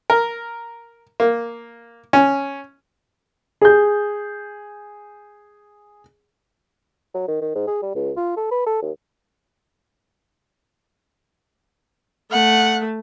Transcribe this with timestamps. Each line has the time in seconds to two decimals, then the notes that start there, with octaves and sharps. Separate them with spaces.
0.10 A#4
1.20 A#3
2.13 C#4
3.61 G#4 G6
7.14 F#3
7.28 D#3
7.41 D#3
7.55 G#2
7.67 G#4
7.83 G3
7.95 C#2
8.17 F4
8.37 A4
8.51 B4
8.66 A4
8.82 D#2
12.32 A3 F#5